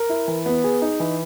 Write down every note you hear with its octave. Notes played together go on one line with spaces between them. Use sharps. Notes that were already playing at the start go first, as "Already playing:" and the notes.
Already playing: A#4
E4
E3
B3
G#4
D#4
E3